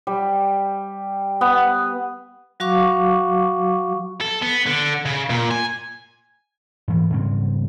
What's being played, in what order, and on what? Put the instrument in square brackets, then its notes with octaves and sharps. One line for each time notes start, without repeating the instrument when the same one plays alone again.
[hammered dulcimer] G3
B3
[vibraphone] F#3 F#4 F5 C#6 D6
[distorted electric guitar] A4
B3
D3
C#3
A#2
G#5
[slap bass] G#2 E3
G#2 C#3 G3 C4